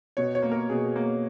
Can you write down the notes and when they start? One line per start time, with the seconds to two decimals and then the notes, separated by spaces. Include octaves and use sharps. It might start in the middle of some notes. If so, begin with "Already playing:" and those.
0.17 B2 C#5
0.35 C#5
0.43 A#3
0.52 A#4
0.69 B2 G#4
0.96 A#3